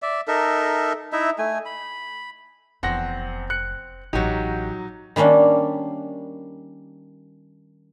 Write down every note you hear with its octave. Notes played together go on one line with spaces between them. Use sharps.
D5 E5
D#4 A4 A#4 E5
D#4 E4 E5
A3 G#5
B5
F1 E2 C4 F#5 A#6
F#6 C#7
A1 F#3 D#4 F#4 G4
D#3 G3 A#3 C#4 D4